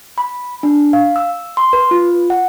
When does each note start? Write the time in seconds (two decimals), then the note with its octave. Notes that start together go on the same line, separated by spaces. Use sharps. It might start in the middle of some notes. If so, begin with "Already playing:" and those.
0.18 B5
0.63 D4
0.93 F5
1.16 E6
1.57 C6
1.73 B4
1.91 F4
2.30 F#5